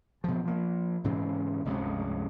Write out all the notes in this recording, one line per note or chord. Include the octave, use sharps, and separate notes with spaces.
B2 F3
F3 A#3
G#2 C#3 E3 C4
F1 C#2 G2 B2